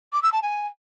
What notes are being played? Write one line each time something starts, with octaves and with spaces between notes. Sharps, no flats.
D6
E6
A5
G#5